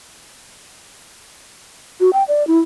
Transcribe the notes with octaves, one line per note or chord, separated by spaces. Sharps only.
F#4
G5
D5
E4